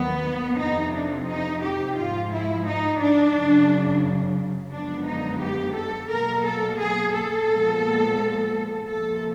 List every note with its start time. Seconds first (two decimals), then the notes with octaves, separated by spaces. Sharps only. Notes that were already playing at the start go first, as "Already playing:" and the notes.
Already playing: D#2 D#3 F#3 B3
0.59 F2 C3 F3 D#4
0.94 D4
1.28 D#4
1.63 G4
1.97 G#2 F3 G#3 F4
2.32 E4
2.66 D#4
3.00 D4
3.35 F#2 C#3 F#3
4.73 F#2 D3 F3 G#3 B3 D4
5.07 D#4
5.41 G4
5.76 A4
6.10 B2 F#3 A#3 A#4
6.45 A4
6.79 G#4
7.14 A4
7.48 A#2 F3 G#3 B3
8.86 C3 F3 A#3 A4